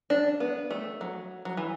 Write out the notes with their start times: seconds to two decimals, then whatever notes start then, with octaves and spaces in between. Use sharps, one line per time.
0.10 D4
0.40 B3
0.71 A3
1.01 F#3
1.45 F#3
1.57 E3